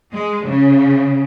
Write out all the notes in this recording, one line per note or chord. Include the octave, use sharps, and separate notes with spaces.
G#3
C#3